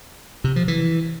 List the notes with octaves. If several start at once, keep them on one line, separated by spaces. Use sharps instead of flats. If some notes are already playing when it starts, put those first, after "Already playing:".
C3
F3
E3